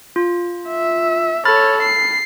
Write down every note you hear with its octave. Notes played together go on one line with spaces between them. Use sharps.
F4
E5
A4 C#5 B5 F6 A6
C7